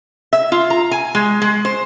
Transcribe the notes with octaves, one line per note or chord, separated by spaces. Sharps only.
E5
F4
A#5
G#5
G#3
G#3
C5